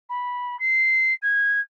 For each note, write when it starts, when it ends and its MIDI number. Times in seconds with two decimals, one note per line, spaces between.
0.09 0.59 83
0.60 1.14 96
1.22 1.60 92